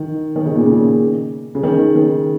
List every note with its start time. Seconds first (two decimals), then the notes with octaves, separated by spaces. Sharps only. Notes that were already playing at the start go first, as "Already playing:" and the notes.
Already playing: D#3
0.36 D#3
0.46 C#3
0.55 A#2
0.66 C#3
1.55 C#3
1.63 D#3
1.96 D#3